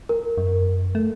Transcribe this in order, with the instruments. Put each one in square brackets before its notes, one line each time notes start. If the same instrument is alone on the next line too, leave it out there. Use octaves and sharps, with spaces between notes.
[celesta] A#4
[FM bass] F#2
A3